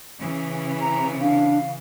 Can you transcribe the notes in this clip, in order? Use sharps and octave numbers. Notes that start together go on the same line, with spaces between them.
C#3 E3
A#5
D4 F5